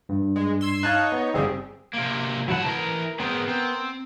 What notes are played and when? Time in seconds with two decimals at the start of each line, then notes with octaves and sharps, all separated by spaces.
0.09 G2
0.36 G#3
0.61 C6 E6 G#6
0.83 D#4 C#5 F5 A5 F#6
1.12 B3
1.34 G1 C#3 G3 C4 G#4
1.94 C3 A#3
2.48 G#2 F#3 E4 F#5 A5
2.66 E3 A#4 A#5
3.20 B3 C4 G#4 A#4
3.48 C4